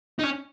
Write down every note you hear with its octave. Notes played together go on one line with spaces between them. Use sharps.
D#4
C#4